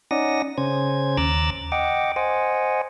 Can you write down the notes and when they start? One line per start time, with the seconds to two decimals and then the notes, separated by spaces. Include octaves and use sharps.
0.11 C#4 D#4 D5 F#5 D#6 A#6
0.58 C#3 C#4 C5 G#6
1.17 D#2 A#5 D6 E6 F#6 A6
1.72 D#5 F#5 G5 D6
2.16 C5 D#5 F#5 G#5